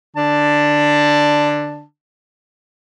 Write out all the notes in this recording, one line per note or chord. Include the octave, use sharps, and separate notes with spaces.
D3 D4 A5